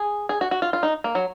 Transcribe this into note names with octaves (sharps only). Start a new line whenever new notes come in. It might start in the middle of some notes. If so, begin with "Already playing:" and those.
Already playing: G#4
G#4
F#4
F#4
F4
F4
D#4
A#3
F#3